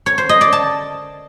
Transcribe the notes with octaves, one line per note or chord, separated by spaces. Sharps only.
C#5
C5
D#5
D5
A5